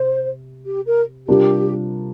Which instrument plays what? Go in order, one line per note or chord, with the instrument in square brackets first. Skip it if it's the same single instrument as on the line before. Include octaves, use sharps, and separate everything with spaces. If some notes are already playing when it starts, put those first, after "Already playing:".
Already playing: [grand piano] C3 [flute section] C5
[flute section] G4
A#4
[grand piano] C3 G3 D4 F4 A#4 [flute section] G4